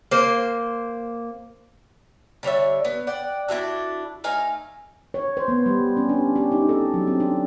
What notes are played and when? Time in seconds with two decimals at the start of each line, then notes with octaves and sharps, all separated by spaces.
0.11 A#3 C5
2.43 D3 G3 C#5 E5
2.85 B3
3.07 D5 F#5 G5
3.48 D4 E4 F#4 A4
4.24 A3 D#4 F5 G#5
5.14 C#5
5.37 C5
5.48 B3
5.66 G3
5.97 C#4
6.09 D4
6.36 G4
6.52 D#4
6.69 A4
6.94 F#3
7.07 C4
7.20 D4